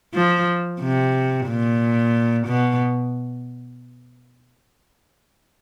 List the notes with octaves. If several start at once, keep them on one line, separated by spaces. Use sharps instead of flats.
F3
C3
A#2
B2